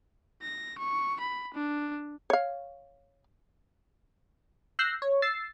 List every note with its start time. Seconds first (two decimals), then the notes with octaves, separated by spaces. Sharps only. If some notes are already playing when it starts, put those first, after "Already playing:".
0.42 A#6
0.78 C#6
1.20 B5
1.54 D4
2.30 C#5 F5
4.79 E6 F#6 G6 A#6 C7
5.02 C#5
5.22 E6 A6 C7